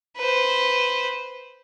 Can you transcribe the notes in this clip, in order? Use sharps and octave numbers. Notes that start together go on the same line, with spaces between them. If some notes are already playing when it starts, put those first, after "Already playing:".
B4 C5